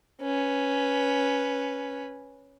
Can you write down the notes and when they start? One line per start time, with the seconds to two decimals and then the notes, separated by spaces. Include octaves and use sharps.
0.21 C#4 B4